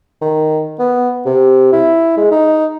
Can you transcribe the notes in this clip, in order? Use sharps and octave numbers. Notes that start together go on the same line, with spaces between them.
D#3
B3
C3
E4
G#3
D#4